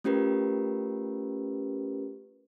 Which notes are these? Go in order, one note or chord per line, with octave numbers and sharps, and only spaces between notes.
A3 C#4 F4 G4 A#4 B4